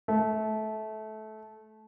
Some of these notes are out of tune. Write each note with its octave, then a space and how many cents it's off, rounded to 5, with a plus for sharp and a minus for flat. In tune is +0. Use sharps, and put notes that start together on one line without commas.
A3 -20